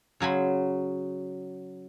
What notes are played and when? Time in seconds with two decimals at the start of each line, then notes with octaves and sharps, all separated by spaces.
0.20 C#3 F#3 G#5 B5 C6